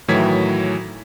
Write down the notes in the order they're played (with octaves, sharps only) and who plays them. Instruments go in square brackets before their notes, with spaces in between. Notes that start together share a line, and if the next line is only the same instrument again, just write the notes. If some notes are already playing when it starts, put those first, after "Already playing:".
[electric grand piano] A2 D#3 E3 F#3 G#6 B6